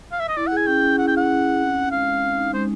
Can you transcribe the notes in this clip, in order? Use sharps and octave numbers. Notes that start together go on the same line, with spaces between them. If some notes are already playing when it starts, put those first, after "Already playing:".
F5
E5
D#5
E4 D5
G#4 F#5
G#5
C#4 G5
C#4
E4 F#5
G5
G#4 F#5
C#4
C#4
C4
D#4
G#3 F5
G#3
C4
D#4
G#3 C5